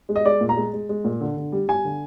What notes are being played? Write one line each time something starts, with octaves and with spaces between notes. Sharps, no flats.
G#3
D#5
G#3 D5
A#2
A#5
G#3
G#3
G#3
A#2
D3
D3
G3
G3 G#5
D3